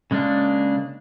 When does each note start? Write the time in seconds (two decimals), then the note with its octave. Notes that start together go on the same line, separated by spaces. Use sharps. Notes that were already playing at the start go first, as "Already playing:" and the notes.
0.11 C#3 G#3 A#3 D4